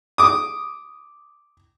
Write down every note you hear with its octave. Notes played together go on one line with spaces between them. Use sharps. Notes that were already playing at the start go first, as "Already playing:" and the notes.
D6 D#6